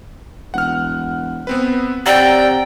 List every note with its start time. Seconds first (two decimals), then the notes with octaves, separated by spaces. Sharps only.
0.54 E1 F#5 F6
1.47 B3 C4 B4
2.06 C3 D5 F#5 G5 A#5 E6